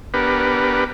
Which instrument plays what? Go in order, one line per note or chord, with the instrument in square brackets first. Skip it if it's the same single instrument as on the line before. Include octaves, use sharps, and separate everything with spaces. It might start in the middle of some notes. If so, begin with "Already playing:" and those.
[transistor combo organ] B3 D4 G4 A#4 B4